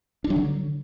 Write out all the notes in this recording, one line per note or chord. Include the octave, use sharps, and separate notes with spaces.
D4
F#3
D3